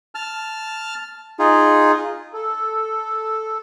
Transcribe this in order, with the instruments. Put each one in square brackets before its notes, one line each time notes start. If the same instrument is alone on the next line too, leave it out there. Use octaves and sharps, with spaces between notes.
[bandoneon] A5 F6
D#4 F4 G#4
[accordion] A4